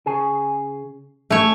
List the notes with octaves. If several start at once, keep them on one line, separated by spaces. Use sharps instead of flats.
C#3 G#4 G#5
A3 C#4 C#5